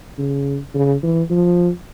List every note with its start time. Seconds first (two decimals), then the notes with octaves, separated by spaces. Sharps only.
0.19 C#3
0.75 C#3
1.03 E3
1.30 F3